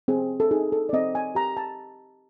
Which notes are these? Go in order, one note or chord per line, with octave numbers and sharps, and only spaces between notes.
C4 G#4
A4
D#4 G#4
A4
D5
C4 D#5
G#5
G4 A#5
A5